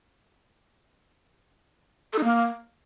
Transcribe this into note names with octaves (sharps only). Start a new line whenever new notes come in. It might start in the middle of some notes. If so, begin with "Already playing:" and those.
A4
D#4
A#3